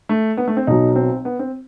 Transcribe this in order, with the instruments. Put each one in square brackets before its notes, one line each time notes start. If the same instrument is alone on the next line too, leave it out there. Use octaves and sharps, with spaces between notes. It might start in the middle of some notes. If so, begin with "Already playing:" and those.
[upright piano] A3
B3
A3
C4
[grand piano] B1 B2 F#3 [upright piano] D#4
[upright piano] C4
B3
C4